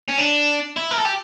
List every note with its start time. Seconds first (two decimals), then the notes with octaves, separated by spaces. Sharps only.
0.09 C#4
0.19 D4
0.77 E4
0.91 A#4
0.98 A4
1.05 G4